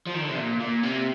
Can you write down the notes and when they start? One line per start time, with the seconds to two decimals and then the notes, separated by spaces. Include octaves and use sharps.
0.07 F3
0.14 D#3
0.22 D3
0.29 C3
0.37 A#2
0.60 A#2
0.83 C3